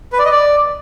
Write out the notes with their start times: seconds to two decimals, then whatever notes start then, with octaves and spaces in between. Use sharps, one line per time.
0.13 B4
0.19 D5
0.25 D#5
0.31 D5